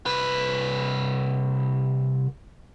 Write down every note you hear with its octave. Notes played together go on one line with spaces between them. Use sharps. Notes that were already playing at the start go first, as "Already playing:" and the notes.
C2 B4